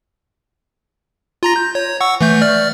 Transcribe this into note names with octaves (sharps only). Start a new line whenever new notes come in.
F4 A#5 A#6
G6
C#5
F#5 C#6 E6
E3 A3 G6
D5 F6